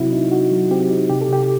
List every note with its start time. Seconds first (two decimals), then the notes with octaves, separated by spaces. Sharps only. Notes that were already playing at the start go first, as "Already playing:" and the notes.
Already playing: C3 F#3 C4 E4 F#4
0.13 D#4
0.32 D#4 F#4
0.51 F#3
0.71 C4 G4
0.91 D#4
1.10 C3 G4
1.21 A4
1.29 C3 G4